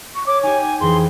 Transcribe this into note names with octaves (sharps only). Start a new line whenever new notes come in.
C#6
C#5 D6
D#4 G4 G#5
F2 E3 G#4 C6